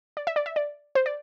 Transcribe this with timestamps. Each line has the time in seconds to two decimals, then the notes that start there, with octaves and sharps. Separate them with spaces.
0.17 D5
0.27 E5
0.36 D5
0.46 E5
0.56 D5
0.95 C5
1.06 D5